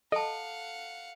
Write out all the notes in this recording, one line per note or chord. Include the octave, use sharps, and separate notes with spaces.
A4 D#5 F5 F#5 A5